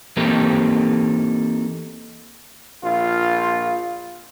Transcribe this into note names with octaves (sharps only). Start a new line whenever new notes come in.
E3 A#3 C4 D#4 G4 A4
A#1 F4